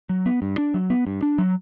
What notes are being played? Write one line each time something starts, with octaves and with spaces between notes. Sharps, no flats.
F#3
B3
G2
D4
F#3
B3
G2
D4
F#3